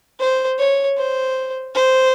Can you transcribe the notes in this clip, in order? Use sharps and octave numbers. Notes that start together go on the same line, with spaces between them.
C5
C#5
C5
C5